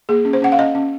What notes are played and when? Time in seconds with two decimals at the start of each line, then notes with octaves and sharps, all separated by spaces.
0.09 A#3 G#4
0.25 C#4
0.33 C5
0.42 C#4 F#5
0.52 F5
0.59 C#4 D#5
0.75 C#4